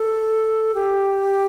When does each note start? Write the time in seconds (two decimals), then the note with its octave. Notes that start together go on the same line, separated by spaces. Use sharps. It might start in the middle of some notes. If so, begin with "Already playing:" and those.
Already playing: A4
0.74 G4